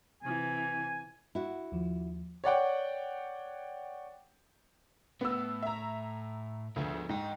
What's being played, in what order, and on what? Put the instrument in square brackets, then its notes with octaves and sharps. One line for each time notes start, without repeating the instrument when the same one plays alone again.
[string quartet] C3 E3 [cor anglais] G#5
[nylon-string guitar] E4 F#4
[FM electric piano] D#2 F3
[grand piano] C#5 D5 F#5 G5
[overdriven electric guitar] A2 A3 [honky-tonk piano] B3 E6
[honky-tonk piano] E5 A#5
[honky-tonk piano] D2 [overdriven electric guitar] F3 B3
[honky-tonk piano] G#2 [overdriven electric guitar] D#5 G5